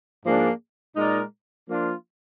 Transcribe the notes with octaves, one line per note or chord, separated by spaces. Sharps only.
G#2 F3 A#3 D4 G#4
A#2 G#3 D#4 A#4 D5
F3 A#3 D4 F4